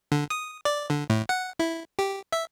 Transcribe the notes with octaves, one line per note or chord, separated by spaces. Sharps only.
D3
D#6
D5
D3
A2
F#5
E4
G4
E5